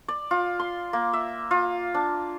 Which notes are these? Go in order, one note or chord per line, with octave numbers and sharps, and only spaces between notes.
D5
F4
C6
A#3
E5
F4
D4